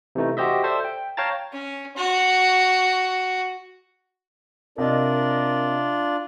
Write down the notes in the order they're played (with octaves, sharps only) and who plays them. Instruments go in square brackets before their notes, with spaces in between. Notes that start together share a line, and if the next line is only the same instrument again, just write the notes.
[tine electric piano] C3 E3 A3 D#4
F#4 G4 C5 D#5 E5
A4 C5 D5 E5
G5
C#5 F5 G5 A5 A#5 A6
[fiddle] C#4
F#4
[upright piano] C3 D#5 [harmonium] D4 F4 D5 [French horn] A#4